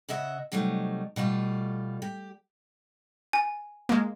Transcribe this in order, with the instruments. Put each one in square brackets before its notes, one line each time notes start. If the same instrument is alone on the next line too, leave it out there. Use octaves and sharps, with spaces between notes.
[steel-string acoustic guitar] C#3 D#5 E5 F#5
C3 F#3 G3 A3 D#4
B2 G3 A3 F4
G4
[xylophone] G#5
[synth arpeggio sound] G#3 A#3